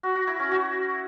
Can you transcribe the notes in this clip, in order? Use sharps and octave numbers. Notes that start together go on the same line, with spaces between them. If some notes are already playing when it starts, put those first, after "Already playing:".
F#4
F#4
E4
C#4
F#4